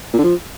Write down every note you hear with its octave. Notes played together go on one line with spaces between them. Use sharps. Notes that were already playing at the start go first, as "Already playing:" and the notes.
A#2
D3
F3